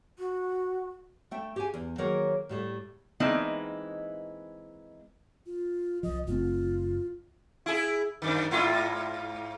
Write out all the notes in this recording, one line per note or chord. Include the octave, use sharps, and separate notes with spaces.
F#4
A3 E5 G5
G4 G#4 G#5
E2
D#3 F#3 A#3 G#4 A#4 C#5
A2 G3 A3
E3 G#3 A#3 C4 D#4 E4
F4
C2 F3 D#5
F#1 A3 C4 F4
E4 G#4
F#2 D#3
G#2 E4 F4